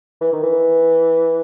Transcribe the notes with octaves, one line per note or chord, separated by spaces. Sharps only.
E3
D#3
E3